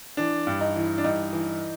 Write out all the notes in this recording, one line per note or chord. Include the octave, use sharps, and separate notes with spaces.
E3 D4
G2
D#4
E3
D4
G2 D#4
E3